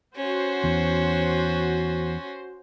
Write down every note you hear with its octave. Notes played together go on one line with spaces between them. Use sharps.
C#4 F#4 C5
E2